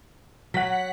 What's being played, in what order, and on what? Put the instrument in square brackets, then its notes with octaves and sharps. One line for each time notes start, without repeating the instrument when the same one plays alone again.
[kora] F#3 [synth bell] F#5 B6